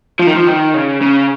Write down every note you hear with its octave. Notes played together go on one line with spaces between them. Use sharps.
F3
D#3
F3
D#3
C#3
C#3